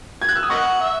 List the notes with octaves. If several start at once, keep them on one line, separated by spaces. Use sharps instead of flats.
G#6
F#6
E6
D#6
A#4 D#5 F#5 C#6
E5